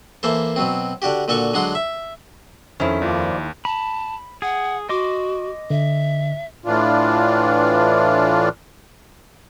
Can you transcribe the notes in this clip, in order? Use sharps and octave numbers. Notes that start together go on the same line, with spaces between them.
E3 A#3 A4 C5
B2 F#3 C4
D3 D4 F#4 G4
A#2 D3 F#4 A4 C#6
D3 F#3 G#3 D4 F#5 C6
E5
F2 D#3 C#4 E4
D#2 F3 F4 D5
A5 B5
G#4 F#5
F#4 D#5 C6 D6
D3 E5
A2 E3 D4 F4